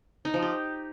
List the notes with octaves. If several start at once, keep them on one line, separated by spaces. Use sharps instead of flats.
D#4
F3
G4